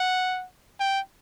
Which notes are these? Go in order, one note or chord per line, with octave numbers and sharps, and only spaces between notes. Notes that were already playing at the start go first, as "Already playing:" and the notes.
Already playing: F#5
G5